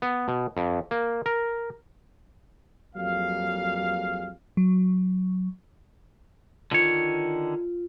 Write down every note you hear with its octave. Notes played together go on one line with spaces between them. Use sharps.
B3
B2
F2
A#3
A#4
F2 F#3 G3 A#3 G#4 F5
F#3
D3 D#3 F4 C#5